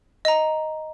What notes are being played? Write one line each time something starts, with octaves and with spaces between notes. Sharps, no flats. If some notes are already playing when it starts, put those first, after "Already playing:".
D#5 A#5